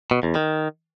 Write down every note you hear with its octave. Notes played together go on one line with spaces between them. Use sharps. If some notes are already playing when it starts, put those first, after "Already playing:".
B2
E2
D#3